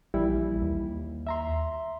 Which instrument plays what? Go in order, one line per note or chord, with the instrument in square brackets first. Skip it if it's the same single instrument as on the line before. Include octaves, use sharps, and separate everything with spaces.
[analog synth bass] A#1 [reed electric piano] E3 G3 E4
[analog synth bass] D#2
[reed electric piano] E5 A#5 C6